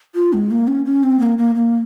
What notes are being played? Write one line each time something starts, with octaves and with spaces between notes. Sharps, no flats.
F4
G#3
A#3
C#4
C#4
C4
A#3
A#3
A#3